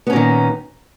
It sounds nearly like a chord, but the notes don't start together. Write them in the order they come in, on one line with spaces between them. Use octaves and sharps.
B3 C#4 A#2 D#3